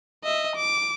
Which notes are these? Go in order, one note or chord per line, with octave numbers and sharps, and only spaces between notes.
D#5 E5
D6